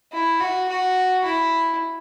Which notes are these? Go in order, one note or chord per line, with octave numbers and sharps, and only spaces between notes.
E4
F#4
F#4
E4